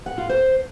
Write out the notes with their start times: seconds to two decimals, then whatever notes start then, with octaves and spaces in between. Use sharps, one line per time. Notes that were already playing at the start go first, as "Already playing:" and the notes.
0.06 F#5
0.18 F4
0.29 C5